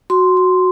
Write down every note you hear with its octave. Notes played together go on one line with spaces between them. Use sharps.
F#4 C6
F#4